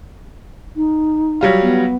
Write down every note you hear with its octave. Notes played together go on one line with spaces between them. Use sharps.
D#4
F#3 G3 F4
B3